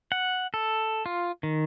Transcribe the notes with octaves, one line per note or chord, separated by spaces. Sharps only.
F#5
A4
F4
D#3